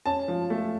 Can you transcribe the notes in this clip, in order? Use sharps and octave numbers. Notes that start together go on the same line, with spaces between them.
C#4 A5
F3
A3